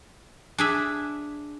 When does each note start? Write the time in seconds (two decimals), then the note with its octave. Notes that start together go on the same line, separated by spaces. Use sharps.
0.58 D4 G#4 E5